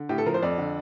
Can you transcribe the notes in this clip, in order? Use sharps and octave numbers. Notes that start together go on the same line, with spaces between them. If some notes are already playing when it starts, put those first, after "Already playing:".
Already playing: D3
A2 G4
A4
F3 A#4
C5
F2 D5
D3